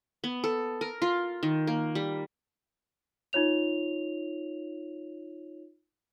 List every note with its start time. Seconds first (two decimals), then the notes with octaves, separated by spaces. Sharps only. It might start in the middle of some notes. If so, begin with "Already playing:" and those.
0.24 B3
0.44 A4
0.81 A#4
1.02 F4
1.43 D#3
1.67 A#3
1.95 G3
3.33 D#4 F4 C#5 F7